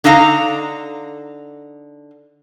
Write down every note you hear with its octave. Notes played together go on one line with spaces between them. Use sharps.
D3 D#4 A4 F5 A#5